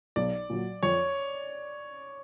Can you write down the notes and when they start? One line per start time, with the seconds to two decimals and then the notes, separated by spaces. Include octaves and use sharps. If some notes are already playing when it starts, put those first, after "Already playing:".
0.16 B1 D5
0.50 A#2 F#3
0.83 F2 C#5